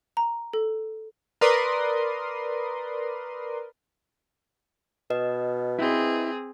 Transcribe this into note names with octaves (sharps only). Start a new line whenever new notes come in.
A#5
A4
A#4 B4 D5 C6 D#6
B2 B4 D#5
C4 E4 G#4